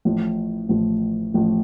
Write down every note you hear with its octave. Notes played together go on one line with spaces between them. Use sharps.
A1 A2 F3
A1 A2 F3
A1 A2 F3